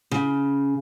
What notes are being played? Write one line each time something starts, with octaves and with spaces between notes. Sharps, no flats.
C#3